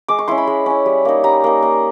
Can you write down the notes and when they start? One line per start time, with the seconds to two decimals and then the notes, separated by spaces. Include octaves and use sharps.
0.08 G#3 D6
0.19 C#6
0.28 C#4 E4 C6
0.38 B5
0.47 G#3
0.66 C#4 E4
0.86 G3
1.05 A#3 D#4
1.24 G3 A#5
1.44 A#3 D#4
1.63 A#3